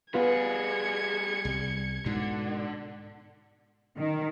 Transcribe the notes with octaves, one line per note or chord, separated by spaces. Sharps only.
G3 B3 F4 G#4 B4 G#6 C#7
C2 G3
G#2 B2 D3
D#3